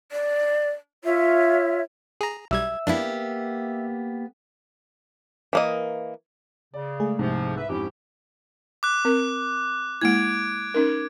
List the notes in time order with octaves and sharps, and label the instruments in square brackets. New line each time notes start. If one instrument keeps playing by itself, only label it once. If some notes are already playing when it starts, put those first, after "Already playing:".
[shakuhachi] D5
[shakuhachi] F4 [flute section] C#5 E5
[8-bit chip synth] G#4 A#5
[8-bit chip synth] B1 G3 G#6 [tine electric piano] E5 E6
[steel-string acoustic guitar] A#3 B3 G4 [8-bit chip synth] D4 E4
[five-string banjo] E3 A#3 D#5
[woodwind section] C#3 [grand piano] D5
[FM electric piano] G#3 A3 G#4
[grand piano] C2 G#2 [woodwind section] C3 F3
[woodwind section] B4 E5
[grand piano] F2 G#2 [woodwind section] C#4 E4 G4
[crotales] D6 F#6
[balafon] C4 A#4
[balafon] G#3 A#3 E4 [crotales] G#6 D7
[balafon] C#4 D#4 A#4